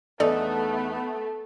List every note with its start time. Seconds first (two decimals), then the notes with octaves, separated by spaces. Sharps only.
0.20 E2 A3 B3 D#4 A4 D5